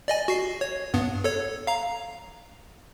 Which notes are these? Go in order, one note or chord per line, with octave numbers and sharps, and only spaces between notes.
D5 D#5 G#5
F#4 C7
C#5
G2 B3
A4 C#5
F5 A#5